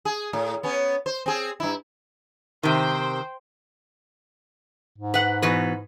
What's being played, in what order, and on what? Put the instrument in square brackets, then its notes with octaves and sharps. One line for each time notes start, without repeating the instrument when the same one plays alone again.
[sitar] G#4
A2
B3 C#4
C5
C4 G#4
G2 E4
[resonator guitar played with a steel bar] C3 D#3 [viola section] C5 G5
[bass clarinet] G#2
[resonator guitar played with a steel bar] B4 F#5
B2 E3 B4